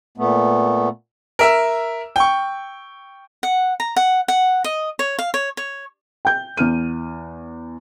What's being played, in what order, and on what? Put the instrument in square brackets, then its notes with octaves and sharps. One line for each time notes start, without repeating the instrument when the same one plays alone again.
[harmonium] A#2 A3 B3
[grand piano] A#4 E5 E6
G5 C#6
[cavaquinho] F#5
A#5
F#5
F#5
D#5
C#5
F5
C#5
C#5
[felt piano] G5 G6
E2 F6 D#7